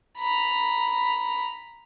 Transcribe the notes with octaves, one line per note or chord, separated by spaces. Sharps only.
A#5 B5